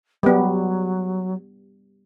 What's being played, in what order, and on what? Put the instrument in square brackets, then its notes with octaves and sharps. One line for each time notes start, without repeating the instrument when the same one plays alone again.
[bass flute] F#3 [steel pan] G3 B3